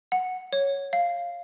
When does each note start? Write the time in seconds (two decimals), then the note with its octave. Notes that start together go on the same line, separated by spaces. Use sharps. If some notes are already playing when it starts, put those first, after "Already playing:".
0.12 F#5
0.53 C#5
0.93 F5